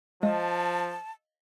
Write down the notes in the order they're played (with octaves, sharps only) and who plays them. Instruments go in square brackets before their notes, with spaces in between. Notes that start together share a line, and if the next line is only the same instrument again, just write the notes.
[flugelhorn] F3 [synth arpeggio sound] G#3 [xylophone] D#5 F5 [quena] A5